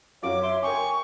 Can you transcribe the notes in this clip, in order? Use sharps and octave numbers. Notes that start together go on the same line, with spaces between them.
F#2 F#4 C#5 F5 D6
E5 C6
A#4 G5 G#5 C#6 D6